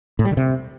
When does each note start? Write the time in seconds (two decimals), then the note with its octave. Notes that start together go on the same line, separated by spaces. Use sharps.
0.19 A2
0.25 G3
0.31 D3
0.37 C3